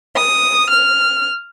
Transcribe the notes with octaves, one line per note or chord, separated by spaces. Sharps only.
D#6
F6